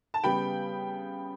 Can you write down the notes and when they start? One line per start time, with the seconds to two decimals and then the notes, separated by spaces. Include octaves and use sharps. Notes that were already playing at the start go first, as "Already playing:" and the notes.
0.14 A5
0.24 C#3 G3 B3 G5 B5